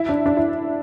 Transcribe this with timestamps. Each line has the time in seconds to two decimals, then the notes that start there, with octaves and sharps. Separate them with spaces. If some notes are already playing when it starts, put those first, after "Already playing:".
Already playing: E4
0.09 D4
0.26 D4
0.37 E4